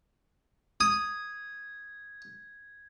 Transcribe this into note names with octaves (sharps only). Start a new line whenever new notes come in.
D#6 G#6